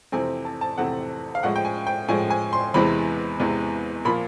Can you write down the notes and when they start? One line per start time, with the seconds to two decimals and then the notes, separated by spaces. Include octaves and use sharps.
0.12 F2 C3 E3 A3 C4 G#5
0.45 A5
0.61 A5
0.78 F2 C3 E3 A3 C4 F#5
1.35 F5
1.43 A2 F3 G#3 F#5
1.56 G5
1.65 G#5
1.87 G5
2.08 A2 F3 G#3 G#5
2.30 G#5
2.53 C6
2.74 E2 C3 E3 G#3 B5
3.40 E2 C3 E3 G#3
4.05 A#2 F3 A#3 B5